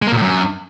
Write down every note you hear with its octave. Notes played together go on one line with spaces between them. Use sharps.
G#3
A#3
A#2
A2
F#2